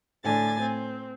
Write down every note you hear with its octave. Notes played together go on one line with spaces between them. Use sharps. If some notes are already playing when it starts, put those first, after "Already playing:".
A2 D3 G#5 A6
C4